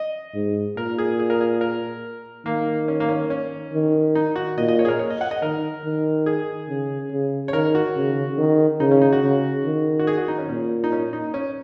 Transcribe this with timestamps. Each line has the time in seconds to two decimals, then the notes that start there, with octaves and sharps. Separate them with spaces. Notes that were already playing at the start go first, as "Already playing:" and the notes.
Already playing: D#5
0.35 G#2
0.77 A#2 A#4
0.98 G#4
1.19 G#4
1.30 A#4
1.41 G#4
1.61 A#4
2.46 D#3 A#3
2.88 C#4
3.00 A#3
3.09 C#4
3.30 C#4
3.73 D#3
4.15 D#4
4.36 F#4
4.58 A#2 D#5
4.68 D#5
4.79 C#5
4.85 G#4
4.88 A#4
4.99 C#5
5.10 D#5
5.21 F#5
5.31 D#5
5.42 D#3 A#4
5.84 D#3
6.26 G#4
6.68 C#3
7.11 C#3
7.48 C#5
7.53 D#3 A#4
7.75 F#4
7.96 C#3
8.38 D#3
8.80 C#3 D#4
8.91 C#4
9.02 D#4
9.12 F#4
9.22 C#3
9.65 D#3
9.99 F#4
10.07 G#4
10.18 F#4
10.28 D#4
10.38 C#4
10.49 A#2 C#4
10.84 D#4
10.92 C#4
11.13 D#4
11.34 C#4